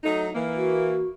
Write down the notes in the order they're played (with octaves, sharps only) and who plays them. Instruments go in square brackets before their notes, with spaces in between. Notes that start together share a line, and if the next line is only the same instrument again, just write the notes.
[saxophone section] F#3 A3 D#4
E3 A#3
[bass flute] F#4